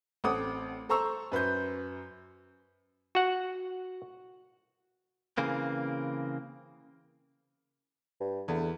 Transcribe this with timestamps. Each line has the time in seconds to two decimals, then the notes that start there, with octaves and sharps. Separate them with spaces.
0.24 A1 C4 A4 F#5 D6 D#6
0.89 A4 C5 A#5 C#6 E6
1.32 F#2 B4 C5 G6
3.15 F#4 F#5
5.37 C#3 E3 A#3 C4
8.20 G2
8.48 E2 D3